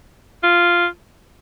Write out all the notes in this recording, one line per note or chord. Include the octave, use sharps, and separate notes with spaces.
F4